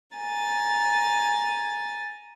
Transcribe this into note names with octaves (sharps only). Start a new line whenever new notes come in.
G#5 A#5 A6